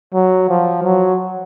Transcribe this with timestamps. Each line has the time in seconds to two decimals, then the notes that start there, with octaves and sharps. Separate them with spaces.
0.14 F#3
0.49 F3
0.83 F#3